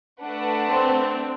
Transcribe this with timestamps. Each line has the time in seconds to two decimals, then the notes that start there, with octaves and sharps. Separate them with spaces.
0.23 A3 D4 B4 F#5
0.69 C4